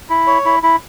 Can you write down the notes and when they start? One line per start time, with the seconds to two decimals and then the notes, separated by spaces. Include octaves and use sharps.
0.10 E4
0.27 C#5
0.45 E4
0.63 E4